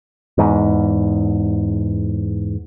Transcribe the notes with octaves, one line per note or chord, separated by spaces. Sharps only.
E2 G#2